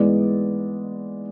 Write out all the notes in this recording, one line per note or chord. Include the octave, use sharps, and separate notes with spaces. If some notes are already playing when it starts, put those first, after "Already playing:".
Already playing: G#2 E3 G#3 B3 D5